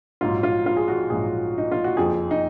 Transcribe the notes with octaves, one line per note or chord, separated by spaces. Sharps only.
A#1 G#2 F#3 F4
F4
F4
G#4
F#4
A#1 G#2 F#3 G#4
D#4
F4
F#4
F#1 F2 F3 G#4
D#4